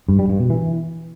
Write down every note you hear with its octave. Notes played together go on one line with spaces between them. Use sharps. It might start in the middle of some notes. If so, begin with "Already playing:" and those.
G2
G3
G2
B2
E3